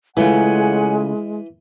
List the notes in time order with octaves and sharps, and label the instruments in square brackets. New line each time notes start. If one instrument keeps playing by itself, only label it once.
[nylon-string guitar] C#3 A3 F4 [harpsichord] E3 [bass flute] G#3 [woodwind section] C#4 F#5 G#5